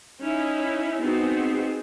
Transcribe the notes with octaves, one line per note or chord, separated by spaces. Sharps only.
C#4 D#4 E4
B3 C4 D#4 F#4 G#4